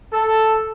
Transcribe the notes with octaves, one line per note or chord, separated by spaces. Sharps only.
A4